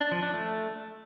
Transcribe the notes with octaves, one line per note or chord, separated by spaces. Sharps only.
D4
F3
D4
A3